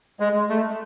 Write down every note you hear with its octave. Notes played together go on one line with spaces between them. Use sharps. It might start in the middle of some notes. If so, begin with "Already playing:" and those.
G#3
A3